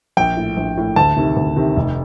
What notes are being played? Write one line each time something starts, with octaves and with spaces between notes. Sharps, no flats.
A#1 G5
A2
A#1
A2
D2 A5
C3 D#3
D2
C3 D#3
F1